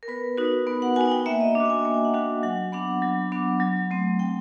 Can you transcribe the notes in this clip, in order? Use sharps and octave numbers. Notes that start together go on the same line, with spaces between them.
A#4
B3 B4
D#4 F#4
B3
F#5
D#4 F#4 G#5
G5
A#3 E5
D#5
D4 F#4
G5
G#5
A#3 G#5
G5
F#5
D4 F#4 G5
F#3 F#5
B3 D4 F#5
F#3
B3 D4
F#3
A3 C4
F#3 G5